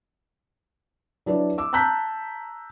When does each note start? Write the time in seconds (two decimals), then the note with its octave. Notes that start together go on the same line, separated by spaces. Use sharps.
1.26 F#3 D4 E4 B4 D5
1.58 D6 E6
1.73 A5 A#5 E6 F#6 G6 B6